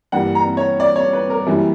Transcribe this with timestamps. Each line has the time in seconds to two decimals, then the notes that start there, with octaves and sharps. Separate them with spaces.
0.12 G2 E3 G3 A#3 F#5
0.35 A#5
0.57 C#5
0.80 D5
0.96 C#5
1.13 B4
1.30 A#4
1.47 F#2 E3 G3 A#3